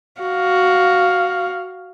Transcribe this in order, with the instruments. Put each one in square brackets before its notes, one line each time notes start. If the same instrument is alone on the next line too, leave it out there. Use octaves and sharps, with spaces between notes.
[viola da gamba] F#4 [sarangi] F5